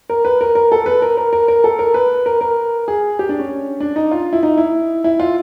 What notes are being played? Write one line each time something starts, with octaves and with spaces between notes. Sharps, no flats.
A#4
B4
A#4
A#4
A4
B4
A#4
A#4
A#4
A#4
A4
A#4
B4
A#4
A#4
G#4
G4
D4
C#4
D4
D#4
F4
E4
D#4
E4
E4
F4